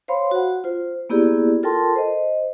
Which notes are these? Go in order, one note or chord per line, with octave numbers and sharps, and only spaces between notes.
C5 C#5 F5 B5 C6
F#4 F#5
F4 C5
A#3 B3 E4 G4 G#4 D5
F4 A4 A#4 G5 A5 C6
C5 D#5